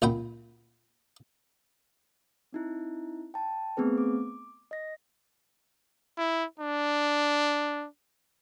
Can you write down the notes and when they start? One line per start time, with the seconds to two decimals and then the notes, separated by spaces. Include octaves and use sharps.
0.02 C#2 A#2 F#5 G5 B5
2.53 C4 D#4 E4
3.34 G5 A5
3.77 A3 B3 C4 G#4 B4
3.98 D6
4.71 D#5 A#6
6.18 E4
6.60 D4